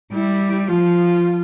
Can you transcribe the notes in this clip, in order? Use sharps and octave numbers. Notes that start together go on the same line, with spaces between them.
G3 E4
F3 F4